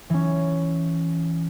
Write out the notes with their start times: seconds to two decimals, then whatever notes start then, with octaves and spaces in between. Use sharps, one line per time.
0.10 E3 C#4